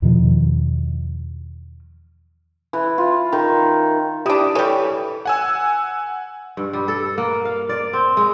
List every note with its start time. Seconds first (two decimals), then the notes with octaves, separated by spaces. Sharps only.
0.02 E2 B2 D#3 F3
2.73 E3
2.98 F4
3.33 D#3
4.26 D4 E4 G4 D#6
4.55 E3 G3 A4 C#5
5.26 F#5 G#5 E6
6.57 G2
6.73 G3
6.88 A4
7.18 A#3
7.45 F5
7.69 D5
7.93 C4
8.17 G#3